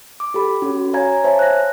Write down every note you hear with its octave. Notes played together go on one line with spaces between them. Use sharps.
D6
G4 A4 B5
C#4 F#4
C#5 F5 G#5 A#5 G#6
C5 C#5 E5 G#5 A5
F#6 A#6